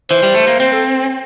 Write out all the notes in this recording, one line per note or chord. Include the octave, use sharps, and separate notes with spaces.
E3 C5
G3
A3
A#3
C4 C5
A4